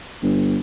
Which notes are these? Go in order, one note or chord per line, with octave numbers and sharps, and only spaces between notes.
G1